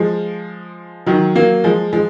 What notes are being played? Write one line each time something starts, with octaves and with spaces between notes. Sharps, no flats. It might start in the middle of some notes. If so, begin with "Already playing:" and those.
Already playing: F3 G#3
D#3 F#3
F#3 A#3
F3 G#3
F3 G#3